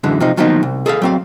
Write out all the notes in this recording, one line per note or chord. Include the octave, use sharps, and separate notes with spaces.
F#2 D3 E3 G#3
C3 F3 D#4
D#3 F3 F#3 A#3 B3 D#4
C2
G#4 A4 B4 F5
F#3 C4 F5